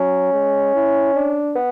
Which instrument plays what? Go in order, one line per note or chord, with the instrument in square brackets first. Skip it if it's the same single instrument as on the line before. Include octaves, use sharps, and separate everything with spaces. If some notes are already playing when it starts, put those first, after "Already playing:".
Already playing: [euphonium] F#3 [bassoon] C#4
[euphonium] G#3
E4
D4
[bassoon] B3